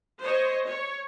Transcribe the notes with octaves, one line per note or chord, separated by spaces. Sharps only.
C5 C#5 D#5
C#5